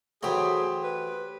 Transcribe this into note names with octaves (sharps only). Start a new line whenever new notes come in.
E3 F#3 A3 G4 G#4 C5
B4